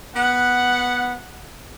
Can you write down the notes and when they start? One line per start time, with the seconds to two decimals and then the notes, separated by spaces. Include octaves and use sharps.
0.16 B3 F#5